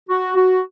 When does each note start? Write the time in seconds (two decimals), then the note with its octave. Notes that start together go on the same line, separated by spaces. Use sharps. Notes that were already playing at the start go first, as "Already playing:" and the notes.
0.09 F#4
0.36 F#4